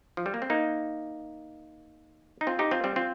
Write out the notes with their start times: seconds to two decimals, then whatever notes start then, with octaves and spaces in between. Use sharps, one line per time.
0.17 F3
0.26 G3
0.34 A#3
0.42 C4
0.50 A#3 D#4
2.41 D#4
2.47 C4 F4
2.59 D#4 G4
2.71 C4 F4
2.84 G3 C4
2.96 C4 F4